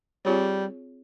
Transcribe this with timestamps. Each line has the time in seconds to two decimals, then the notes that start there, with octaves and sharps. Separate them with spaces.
0.25 G3 C4 F4 G#4 C#5